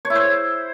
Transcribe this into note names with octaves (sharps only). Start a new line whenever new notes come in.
C#5
E4
C5